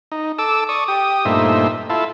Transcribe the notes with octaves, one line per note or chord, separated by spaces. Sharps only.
D#4
A4 D6 E6
D5 C#6 D#6
G4 D#6
G2 A#2 A3 D#4 C5 E5
E4 F4 A4